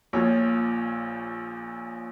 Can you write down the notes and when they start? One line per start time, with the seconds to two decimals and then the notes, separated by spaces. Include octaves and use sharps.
0.13 A#1 A#2 F3 C#5